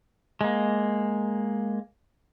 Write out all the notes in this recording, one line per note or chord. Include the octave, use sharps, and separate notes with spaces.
G#3 A#3